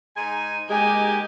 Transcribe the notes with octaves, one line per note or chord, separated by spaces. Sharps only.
G#2 D#4 G#5
G#3 A#3 D#4 G4 G#5